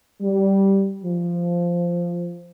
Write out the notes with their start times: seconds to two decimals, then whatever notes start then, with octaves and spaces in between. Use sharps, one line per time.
0.22 G3
1.04 F3